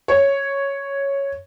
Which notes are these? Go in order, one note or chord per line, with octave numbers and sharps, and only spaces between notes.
C#5